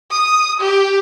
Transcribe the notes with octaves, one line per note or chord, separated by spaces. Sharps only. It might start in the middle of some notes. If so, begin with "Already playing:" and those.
D#6
G4